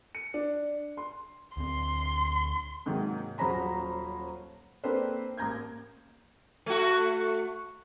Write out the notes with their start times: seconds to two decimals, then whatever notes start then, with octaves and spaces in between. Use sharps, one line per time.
0.15 C#7
0.34 D4
0.97 C6
1.57 D2 C4 C6
2.86 G#2 C3 D#3 F#3 A#3
3.38 D#1 F#3 C#4 C5 A#5 B5
4.84 A#3 C4 D4 A4 B4 C5
5.37 A1 A#3 A#5 G6 G#6
6.66 A3 F#4